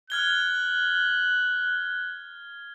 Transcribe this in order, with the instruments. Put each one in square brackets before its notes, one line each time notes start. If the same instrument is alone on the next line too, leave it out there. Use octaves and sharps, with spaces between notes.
[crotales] F6 G#6 G7 [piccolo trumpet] F#6